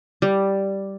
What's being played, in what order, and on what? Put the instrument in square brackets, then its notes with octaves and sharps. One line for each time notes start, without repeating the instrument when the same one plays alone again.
[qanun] G3